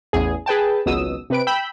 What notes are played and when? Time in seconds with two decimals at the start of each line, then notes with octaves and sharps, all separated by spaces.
0.13 A1 E2 G#4
0.46 G#4 B4 G5 A5
0.86 G#1 C#2 B2 F#3 D#6 E6
1.30 C3 B4 D7
1.47 G5 B5 E6 G6 B6